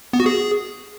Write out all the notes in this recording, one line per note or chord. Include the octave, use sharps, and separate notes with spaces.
B3
F#4
G#4